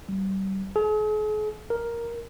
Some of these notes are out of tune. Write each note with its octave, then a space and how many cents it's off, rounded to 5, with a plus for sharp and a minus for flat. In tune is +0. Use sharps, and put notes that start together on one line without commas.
G3 -25
G#4 +45
A#4 +5